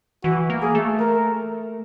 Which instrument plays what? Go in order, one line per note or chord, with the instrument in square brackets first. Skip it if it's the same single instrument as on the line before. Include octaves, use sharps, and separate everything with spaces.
[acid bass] E3 [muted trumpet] F#4
[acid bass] A#3
[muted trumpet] G#4
[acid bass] A3
[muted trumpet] A#4